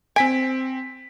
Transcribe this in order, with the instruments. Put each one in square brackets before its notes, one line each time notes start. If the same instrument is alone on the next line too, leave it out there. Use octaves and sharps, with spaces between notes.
[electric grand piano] C4 B6 D7 [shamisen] G#5